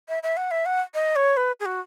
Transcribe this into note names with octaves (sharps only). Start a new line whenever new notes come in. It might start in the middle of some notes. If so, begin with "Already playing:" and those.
E5
E5
F#5
E5
F#5
D#5
C#5
B4
G#4
F#4